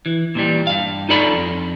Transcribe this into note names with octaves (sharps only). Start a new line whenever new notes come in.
E3
A#2 E3 G3
G2 F5
D#4 F4 A4 D5 B5
F2